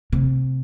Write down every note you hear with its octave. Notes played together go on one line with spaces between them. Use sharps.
C3